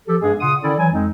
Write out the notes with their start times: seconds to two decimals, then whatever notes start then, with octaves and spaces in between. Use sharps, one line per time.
0.08 F3 G4 A4
0.22 G2 G#3 B3 G#4
0.41 A#2 C#3 F#5 C6 D#6
0.63 D3 D#3 C#4 E4 A4 D5
0.78 E3 F#3 E4 G#5
0.92 F2 G#3 C4 D#4